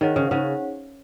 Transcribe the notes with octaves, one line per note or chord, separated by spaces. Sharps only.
D#3 D#4 G#4 C#5 F#5
C#3
C#3 D#4 G#4 C#5 F#5